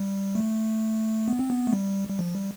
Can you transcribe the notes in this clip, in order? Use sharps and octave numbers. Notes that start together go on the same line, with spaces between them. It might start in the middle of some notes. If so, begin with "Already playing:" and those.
Already playing: G3
A3
B3
C4
B3
A3
G3
G3
F3
G3